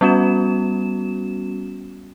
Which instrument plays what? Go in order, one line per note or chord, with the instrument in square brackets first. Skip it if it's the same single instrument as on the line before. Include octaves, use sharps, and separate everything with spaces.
[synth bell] G3 B3 C#4 F#4 E7